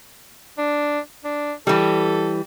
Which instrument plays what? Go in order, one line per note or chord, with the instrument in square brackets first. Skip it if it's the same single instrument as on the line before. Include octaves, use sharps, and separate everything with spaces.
[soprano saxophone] D4
D4
[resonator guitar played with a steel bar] E3 G3 [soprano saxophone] A4